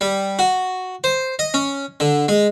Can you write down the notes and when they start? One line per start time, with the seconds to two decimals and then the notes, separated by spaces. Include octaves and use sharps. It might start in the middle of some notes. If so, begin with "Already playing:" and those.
0.01 G3
0.39 F#4
1.04 C5
1.39 D#5
1.54 C#4
2.00 D3
2.28 G#3